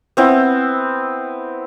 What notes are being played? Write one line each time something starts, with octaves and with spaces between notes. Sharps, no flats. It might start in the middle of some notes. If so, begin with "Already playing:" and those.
B3 C4 E4